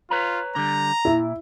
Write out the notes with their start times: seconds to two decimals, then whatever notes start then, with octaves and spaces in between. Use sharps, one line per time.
0.10 F4 B4 C#5 A#5
0.56 D3 G3 A#5
1.05 A#2 E4